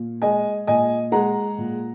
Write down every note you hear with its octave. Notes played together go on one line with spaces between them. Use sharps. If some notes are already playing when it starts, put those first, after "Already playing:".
Already playing: A#2
G#3 D#5 G#5
A#2 D#5 G#5
G#3 F#5 A#5
A#2